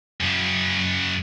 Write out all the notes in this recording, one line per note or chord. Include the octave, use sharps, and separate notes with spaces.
F#2 C#3